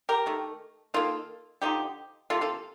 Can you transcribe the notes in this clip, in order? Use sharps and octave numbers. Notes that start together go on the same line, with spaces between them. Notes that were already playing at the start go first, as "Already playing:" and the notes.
G4 A#4
D#3 A3
D#3 A#3 F4 A4
D3 F3 A#3 D#4 G4
C3 F3 A#3 F4 A4
F4 A4